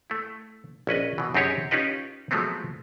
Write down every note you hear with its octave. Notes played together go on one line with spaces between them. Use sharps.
A3 E4
A#1 C#4 B4 D#5
B2 E3
F#2 C4 D#4 G4 G#4 C#5
C#4 D#4 F4 G4 B4 D#5
F3 F#3 G#3 A3 B3 C4